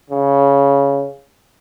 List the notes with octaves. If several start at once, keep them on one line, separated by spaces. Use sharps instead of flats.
C#3